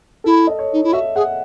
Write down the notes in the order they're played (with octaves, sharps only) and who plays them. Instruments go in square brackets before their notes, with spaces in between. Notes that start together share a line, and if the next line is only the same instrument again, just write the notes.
[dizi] E4 [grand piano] A4
[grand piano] D#5
C#5
[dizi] D#4
E4
[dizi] F#4 [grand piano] E5
[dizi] G#4 [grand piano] F#5